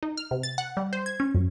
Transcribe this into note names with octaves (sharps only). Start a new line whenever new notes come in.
D#4
F6
C3
A6
F#5
G3
C5
G#6
C#4
F#2